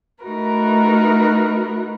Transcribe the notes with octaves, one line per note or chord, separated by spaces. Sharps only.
A3 D#4 E4 F#4 A#4 B4